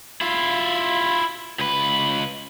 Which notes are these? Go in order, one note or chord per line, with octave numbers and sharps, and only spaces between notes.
E4 F4
C#2 B4